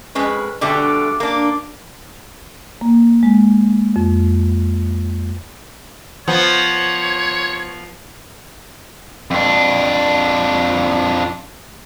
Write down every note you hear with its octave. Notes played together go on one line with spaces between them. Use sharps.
F2 G#3 C#4 B4
B2 D3 G3 A3
A#3 D4
A#3
G#3
F2
F3 B3 C#5
F2 D4